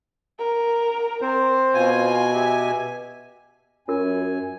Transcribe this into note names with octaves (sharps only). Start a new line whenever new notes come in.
A#4
C4 C5
B2 F4 G#5
G4 E5
F#2 C#4 F4 A#4 G#5